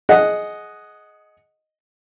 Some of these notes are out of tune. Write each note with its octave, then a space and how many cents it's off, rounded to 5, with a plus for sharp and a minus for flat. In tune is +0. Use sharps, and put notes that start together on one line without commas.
G#4 +20 D#5 +0 F#5 +0